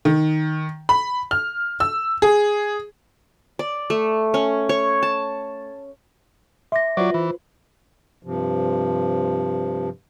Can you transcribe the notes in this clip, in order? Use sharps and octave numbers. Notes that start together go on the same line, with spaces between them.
D#3
B5
F6
E6
G#4
D5
A3
C#4
C#5
A5
E5 C6 D6 A#6
F#3 F4 B4 C5 D5
E3
G2 C3 F3